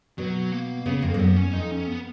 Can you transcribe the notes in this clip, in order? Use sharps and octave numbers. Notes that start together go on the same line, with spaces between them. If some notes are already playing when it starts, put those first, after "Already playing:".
B2 F#3
A#3
C#3 B3
F2 A#3
G#2
F#2 B3
C#4
F2 D#4
C#4
B3